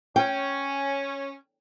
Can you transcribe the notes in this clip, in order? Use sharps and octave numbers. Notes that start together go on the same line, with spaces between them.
C#4 G5